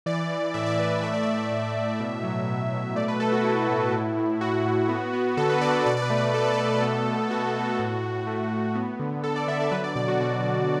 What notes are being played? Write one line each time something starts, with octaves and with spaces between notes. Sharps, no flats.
E3 D5
E3
A2 E5
D5
A2 B4
D5
A3 E5
D5
A3 E5
A2
A2
B2
F#3
B2
B2
A3 D5
B4
A3 A4
F#4
A3 E4
A2
A2
A2
A2 F#4
A2
B3
B3
D3 A4
B4
D3 D5
D5
B2 D5
D5
B4
A3
B4
A3 A4
B4
A4
B2
B3
B2
B2 F#4
B2
A2
A2
A3
A2
B3
D3
D3 A4
D5
D3 E5
D5
F#3 B4
D5
B2 D5
F#4
B2 F#4
B2